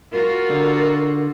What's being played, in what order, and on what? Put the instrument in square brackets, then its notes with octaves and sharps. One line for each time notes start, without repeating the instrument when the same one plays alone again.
[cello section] F4 F#4 [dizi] A#4
[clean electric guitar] D3